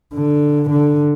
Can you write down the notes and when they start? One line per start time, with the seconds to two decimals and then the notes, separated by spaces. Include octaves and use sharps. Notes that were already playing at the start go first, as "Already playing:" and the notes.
0.14 D3
0.70 D3